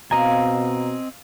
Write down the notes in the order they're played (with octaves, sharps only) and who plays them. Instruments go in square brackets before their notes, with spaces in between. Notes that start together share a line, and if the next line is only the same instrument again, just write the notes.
[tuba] B2 [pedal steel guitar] C4 D#5 G#5 [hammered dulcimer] F5 [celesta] A#5